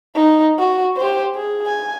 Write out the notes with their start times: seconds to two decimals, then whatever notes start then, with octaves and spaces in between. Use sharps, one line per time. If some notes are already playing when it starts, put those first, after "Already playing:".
0.15 D#4
0.59 F#4
0.97 G4 C5
1.35 G#4
1.66 G#5